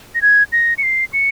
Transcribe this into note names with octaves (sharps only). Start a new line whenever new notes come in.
A#6
G#6
A#6
C#7
C7
C#7